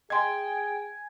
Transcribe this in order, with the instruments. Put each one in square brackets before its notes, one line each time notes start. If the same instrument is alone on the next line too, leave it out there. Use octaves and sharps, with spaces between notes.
[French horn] G#4 [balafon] D#5 C6 [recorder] G5 [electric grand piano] G#5 G#6